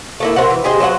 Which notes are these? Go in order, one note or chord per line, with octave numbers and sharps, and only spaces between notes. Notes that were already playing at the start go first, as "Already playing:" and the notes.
A3 A#3 E4
C4 F#4 A#4 F#5
E3
G4 G#4 C5 D#5
F#3 C5 D#5 F#5